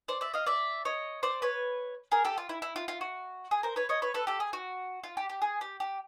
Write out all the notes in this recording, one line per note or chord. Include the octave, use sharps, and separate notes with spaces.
C5 D5
D5 E5
D#5 F5
D5 E5
C#5 D#5
C5 D5
B4 C#5
G#4 A#4
G4 A4
F4
E4
E4
F4
F4
F#4
G#4
A#4 C5
B4 C#5
C#5 D#5
B4 C#5
A4 B4
G4 A4
G#4
F#4
F4
G4
G4
G#4
G4
G4